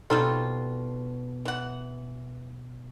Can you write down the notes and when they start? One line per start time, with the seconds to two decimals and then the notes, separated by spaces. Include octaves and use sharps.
0.10 B2 G3 C4 D4 D#4 F4 A4
1.45 E3 F#5